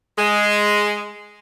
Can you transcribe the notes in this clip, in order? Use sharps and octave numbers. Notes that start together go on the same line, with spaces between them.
G#3